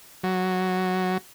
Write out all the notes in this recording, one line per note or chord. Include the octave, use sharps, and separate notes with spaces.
F#3